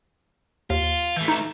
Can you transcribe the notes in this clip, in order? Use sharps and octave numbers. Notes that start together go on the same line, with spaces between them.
D#2 F4
E3 A3 G6
D#4 E7